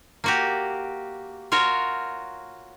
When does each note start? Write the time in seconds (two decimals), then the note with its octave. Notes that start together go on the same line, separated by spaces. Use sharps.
0.24 A#3 F#4 G4
1.52 F4 F#4 A#4 C#5